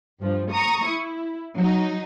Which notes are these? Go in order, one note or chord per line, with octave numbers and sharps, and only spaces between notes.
G2 F3
A#5 C#6 D#6
E4
F#3 D#4